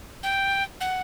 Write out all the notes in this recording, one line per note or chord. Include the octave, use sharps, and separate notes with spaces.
G5
F#5